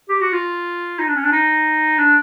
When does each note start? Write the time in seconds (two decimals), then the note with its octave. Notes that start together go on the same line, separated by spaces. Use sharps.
0.09 G4
0.21 F#4
0.32 F4
0.99 D#4
1.08 D4
1.16 C#4
1.24 D4
1.32 D#4
1.98 D4